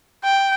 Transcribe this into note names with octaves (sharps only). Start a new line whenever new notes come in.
G5